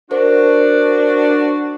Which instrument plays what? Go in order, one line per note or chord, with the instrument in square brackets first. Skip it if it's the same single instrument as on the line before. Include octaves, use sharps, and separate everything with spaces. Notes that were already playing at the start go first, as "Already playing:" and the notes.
[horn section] D4 F#4 [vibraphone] A#4 C5